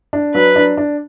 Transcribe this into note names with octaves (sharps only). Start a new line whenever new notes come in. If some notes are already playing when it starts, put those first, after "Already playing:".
D4
F#3 B4
D4
D4